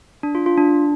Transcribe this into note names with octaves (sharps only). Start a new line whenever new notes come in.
D4
F4
F4
D4